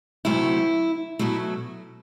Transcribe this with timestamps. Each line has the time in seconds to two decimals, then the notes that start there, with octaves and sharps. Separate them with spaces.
0.25 D2 C3 F#3 A3 E4
1.19 B2 F#3 A3 E4